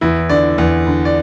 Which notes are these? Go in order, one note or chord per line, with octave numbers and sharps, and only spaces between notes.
E2 E4
D3 D5
E2
D3
D5